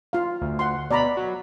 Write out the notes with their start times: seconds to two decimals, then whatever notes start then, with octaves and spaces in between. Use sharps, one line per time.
0.13 F4 F5
0.41 D2
0.59 F#5 C6
0.91 B2 D5 A#5 B5
1.17 F#3